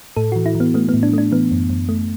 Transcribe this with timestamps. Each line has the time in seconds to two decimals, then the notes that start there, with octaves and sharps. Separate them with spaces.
0.17 A2 A4
0.32 E3 F#4
0.46 E4
0.55 E3
0.60 B3
0.74 A3 B3
0.89 B3
0.94 A2
1.03 D4
1.13 A3 D4
1.32 E3 B3
1.51 F#2
1.70 F#2
1.89 A3